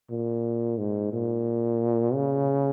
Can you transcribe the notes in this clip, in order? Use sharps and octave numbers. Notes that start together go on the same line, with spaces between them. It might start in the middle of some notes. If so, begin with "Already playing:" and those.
A#2
G#2
A#2
C#3